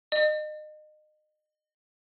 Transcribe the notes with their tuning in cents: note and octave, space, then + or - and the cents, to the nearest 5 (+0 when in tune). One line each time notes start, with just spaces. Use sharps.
D#5 -30